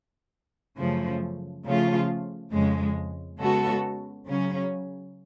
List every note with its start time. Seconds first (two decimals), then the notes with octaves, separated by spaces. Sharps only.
0.78 F#2 C#3 F3 A3
1.65 C#3 F3 A3 F4
2.52 F2 C#3 G#3
3.39 C#3 G#3 B3 F#4 A4
4.26 C#3 F#3 C#4